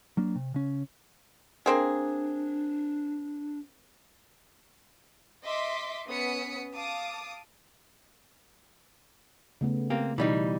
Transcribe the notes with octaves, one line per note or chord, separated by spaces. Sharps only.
F#3 A#3 D4
C3
C#3 C#4
A#3 C4 D4 G#4
D#5 E5 C6 D6 B6
B3 C#4 D#6 B6 C#7
F5 A5 D6 D#6
C#3 A3 B3
A#3 C4 G4
B2 E3 G3 D#4